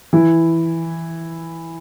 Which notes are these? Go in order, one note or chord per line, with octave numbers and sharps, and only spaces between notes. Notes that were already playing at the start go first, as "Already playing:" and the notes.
E3 E4